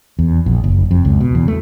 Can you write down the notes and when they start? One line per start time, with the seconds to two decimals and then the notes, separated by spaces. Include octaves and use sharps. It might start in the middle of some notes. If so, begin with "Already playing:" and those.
0.19 E2
0.46 A#1
0.64 F#1
0.91 F2
1.05 C#2
1.20 B2
1.35 E2
1.48 A3